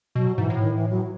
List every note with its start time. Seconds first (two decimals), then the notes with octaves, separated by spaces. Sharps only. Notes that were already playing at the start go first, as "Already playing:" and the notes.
0.15 B2 F#3
0.38 G#2 E3
0.50 A2
0.61 D#3
0.75 E3
0.90 F#3